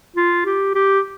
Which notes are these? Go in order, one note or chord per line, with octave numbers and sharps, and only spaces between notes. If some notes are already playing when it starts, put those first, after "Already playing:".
F4
G4
G4